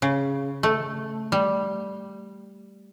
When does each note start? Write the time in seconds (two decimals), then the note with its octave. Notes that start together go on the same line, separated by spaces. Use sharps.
0.02 C#3
0.63 A3
1.32 G3